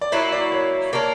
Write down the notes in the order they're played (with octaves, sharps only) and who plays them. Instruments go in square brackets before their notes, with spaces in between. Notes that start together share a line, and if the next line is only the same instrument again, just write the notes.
[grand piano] D5
[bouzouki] F#3 A#3 E4 [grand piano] C#5
[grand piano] D5
C#5
[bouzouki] A#3 D4 A#4 [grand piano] C#5